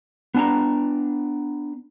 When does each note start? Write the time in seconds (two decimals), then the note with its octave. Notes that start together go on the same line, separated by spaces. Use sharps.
0.34 B3 D4 G#5 A#5